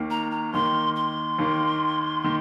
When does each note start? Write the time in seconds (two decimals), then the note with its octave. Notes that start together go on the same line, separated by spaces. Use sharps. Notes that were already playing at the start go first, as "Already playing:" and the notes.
Already playing: D#2 D#3 A#3
0.10 A#5
0.31 A#5
0.53 D#2 D#3 A#3 C6
0.96 C6
1.38 D#2 D#3 A#3
2.24 D#3 A#3